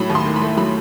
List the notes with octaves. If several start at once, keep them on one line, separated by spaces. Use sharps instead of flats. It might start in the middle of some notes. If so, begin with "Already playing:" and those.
Already playing: A2 F#3 B5
D#2
C6
D#3
B5
A3
F#3 B5